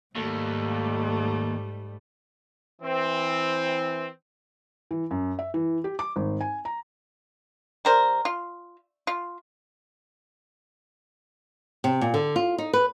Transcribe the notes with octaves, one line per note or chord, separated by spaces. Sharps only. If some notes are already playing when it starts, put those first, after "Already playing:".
D#2 G#2 G3 A3
E3 C4
E3
F#2
E5
E3
G4
D6
G#1
G#5
A#5
G3 A#4 C5
F4
F4
C3
A#2
D3
F4
D#4
B4